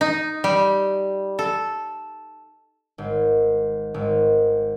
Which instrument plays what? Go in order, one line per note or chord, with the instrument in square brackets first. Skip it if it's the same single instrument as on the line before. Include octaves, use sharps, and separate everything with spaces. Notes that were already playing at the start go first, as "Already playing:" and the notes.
[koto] D#4
G3
A4
[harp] G#1
G#1